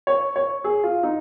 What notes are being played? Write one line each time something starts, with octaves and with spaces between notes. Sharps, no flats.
C#5
C#5
G#4
F4
D#4